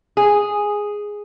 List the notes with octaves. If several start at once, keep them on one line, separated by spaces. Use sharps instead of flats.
G#4